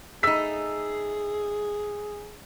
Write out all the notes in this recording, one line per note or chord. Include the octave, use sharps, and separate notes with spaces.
A3 D#4 G#4 E6 B6